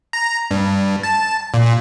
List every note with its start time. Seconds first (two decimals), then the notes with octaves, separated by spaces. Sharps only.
0.13 A#5
0.51 G2
1.03 A5
1.54 A#2